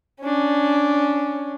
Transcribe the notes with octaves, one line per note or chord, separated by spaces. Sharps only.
C#4 D4